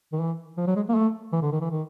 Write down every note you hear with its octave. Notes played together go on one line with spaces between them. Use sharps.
D#3
E3
F3
F#3
G#3
A#3
A3
E3
D3
D#3
E3
D#3